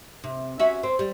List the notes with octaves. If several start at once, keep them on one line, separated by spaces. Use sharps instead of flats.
C3
C#4 F#4 E5
C4
G3